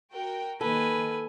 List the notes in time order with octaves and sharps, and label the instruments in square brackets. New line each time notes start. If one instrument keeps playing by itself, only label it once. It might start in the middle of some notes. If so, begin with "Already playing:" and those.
[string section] F#4 A#4 G5
[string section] D#3 A#3 [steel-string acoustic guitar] A4 [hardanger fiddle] B4 G#5